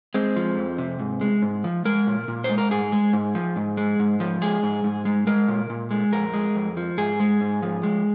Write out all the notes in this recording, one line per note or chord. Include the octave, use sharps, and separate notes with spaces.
G#3 C4
F3
F2
C3
G#2
G#3
G#2
F3
G#3 A#4
A#2
A#2
C5
G#3
A#4
G#2 G#4
G#3
G#2
F3
G#2
G#3
G#2
F3
G#3 G#4
G#2
G#2
G#3
G#3 A#4
A#2
A#2
G#3
F2 A#4
G#3
F2
F3
G#2 G#4
G#3
G#2
F3
G#3